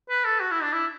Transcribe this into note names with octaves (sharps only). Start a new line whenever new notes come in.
B4
A4
F#4
E4
D4
E4